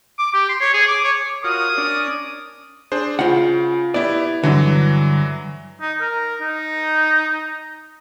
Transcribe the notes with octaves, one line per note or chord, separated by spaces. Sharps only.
D6
G4
C6
C#5
G#4
D6
C#5
F4 F#4 A#4 C#5 D#6
C#4 D4 D5
D4 G#4 C5
C#3 F4 F#5
B3 E4 G4 D5
G2 D3 E3 F#3
D#4
A#4
D#4